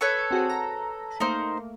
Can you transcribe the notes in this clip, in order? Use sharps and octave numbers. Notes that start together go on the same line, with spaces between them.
A4 B4 C#5 C#6
C4 F#4 G#4
A#5
A3 A#3 D#4 C5